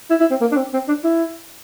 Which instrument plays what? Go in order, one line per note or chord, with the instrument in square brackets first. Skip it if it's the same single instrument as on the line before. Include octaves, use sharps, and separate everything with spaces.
[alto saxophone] E4
E4
C4
A#3
D4
C4
C4
D4
E4